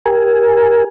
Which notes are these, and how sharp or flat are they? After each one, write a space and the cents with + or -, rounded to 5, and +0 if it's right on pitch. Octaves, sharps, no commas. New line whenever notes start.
G4 +0 A#4 +15 G#5 +0